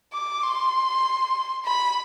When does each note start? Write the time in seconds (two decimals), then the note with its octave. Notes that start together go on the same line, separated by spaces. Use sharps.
0.13 D6
0.43 C6
1.65 B5